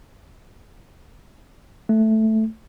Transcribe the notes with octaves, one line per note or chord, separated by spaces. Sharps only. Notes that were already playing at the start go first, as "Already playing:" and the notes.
A3